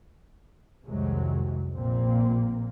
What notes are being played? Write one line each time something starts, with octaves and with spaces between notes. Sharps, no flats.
C2 F2 C3 D#3 F#3 G#3
A#1 A#2 A#3 C4